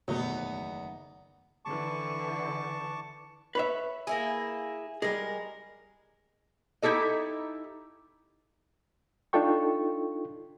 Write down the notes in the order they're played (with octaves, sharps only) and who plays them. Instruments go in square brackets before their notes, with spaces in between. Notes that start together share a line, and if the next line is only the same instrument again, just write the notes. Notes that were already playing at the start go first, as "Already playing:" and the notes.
[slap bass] F#1 D#3 A3 [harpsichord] E2 [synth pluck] B2 F#3 [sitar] B3 D#4
[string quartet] D3 E3 [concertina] A5 C#6 D6
[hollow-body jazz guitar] B4 C#5 E5
[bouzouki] A#3 E4 G#4
[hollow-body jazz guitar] G3 G#4 [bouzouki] G#3 A#4
[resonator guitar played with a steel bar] D#4 E4 G4 A4 D#5
[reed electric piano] D4 D#4 F4 A4 G5 C#6